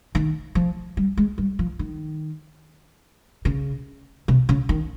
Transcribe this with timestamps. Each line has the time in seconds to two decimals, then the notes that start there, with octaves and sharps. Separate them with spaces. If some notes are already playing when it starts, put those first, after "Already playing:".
0.15 D#3
0.55 F3
0.97 G3
1.17 G#3
1.38 G3
1.59 F3
1.79 D#3
3.45 C#3
4.28 C3
4.49 C#3
4.69 D#3